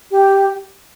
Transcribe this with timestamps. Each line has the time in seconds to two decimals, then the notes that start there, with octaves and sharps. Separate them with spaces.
0.11 G4